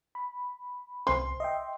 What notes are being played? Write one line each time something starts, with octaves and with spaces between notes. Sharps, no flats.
B5
C2 C5 C6
D#5 E5 G5